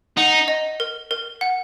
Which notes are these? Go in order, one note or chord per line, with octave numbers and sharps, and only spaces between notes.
D#4 F#5
D#5
A#4
A#4
F#5